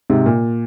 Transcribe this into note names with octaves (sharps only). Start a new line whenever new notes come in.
G#2 C3
A#2